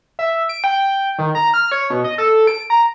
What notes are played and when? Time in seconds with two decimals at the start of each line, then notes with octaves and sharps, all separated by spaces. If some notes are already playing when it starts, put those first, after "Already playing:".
0.19 E5
0.49 D7
0.64 G5
1.19 D#3
1.35 A#5
1.54 F6
1.72 C#5
1.90 B2
2.04 D#5
2.18 A4
2.47 D7
2.70 A#5